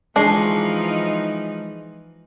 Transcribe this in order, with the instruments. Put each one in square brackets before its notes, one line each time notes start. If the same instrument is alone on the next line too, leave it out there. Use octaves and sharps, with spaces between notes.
[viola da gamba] E3 F3 D#4 [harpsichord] G#3 C6 C#6 [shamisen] D4